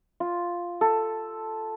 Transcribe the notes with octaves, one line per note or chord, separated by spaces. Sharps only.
F4
A4